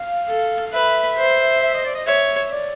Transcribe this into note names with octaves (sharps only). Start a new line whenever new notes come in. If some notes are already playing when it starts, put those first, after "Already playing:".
Already playing: F5
A4
F5
B4 E5
C5
E5
D#5
D5
D#5
C#5 E5
D5